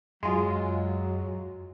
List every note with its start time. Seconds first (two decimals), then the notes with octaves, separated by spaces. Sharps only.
0.23 F#2 F#3 G#3 F4